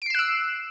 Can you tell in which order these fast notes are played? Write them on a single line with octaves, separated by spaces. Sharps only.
D7 C7 E7 F#6 E6